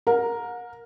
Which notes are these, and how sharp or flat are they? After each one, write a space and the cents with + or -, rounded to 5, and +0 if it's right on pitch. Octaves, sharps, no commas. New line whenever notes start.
A#4 +0 F#5 -40